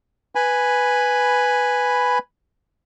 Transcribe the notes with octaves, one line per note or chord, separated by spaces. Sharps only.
B4 G#5 B5